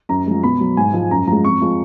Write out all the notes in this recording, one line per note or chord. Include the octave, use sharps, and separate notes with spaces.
F#2 A#5
F3 G#3
B2 B5
F#3
G#2 G#5
F3 G#3
F#2 A#5
F3 G#3 A#5
F2 C#6
F3 G#3